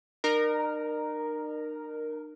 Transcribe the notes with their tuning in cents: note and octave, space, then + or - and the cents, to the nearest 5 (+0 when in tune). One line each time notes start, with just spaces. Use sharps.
D#4 -45 A#4 +0